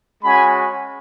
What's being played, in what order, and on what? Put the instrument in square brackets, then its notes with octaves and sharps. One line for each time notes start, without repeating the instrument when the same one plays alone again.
[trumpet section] G#3 C#4 F#4 G#5 B5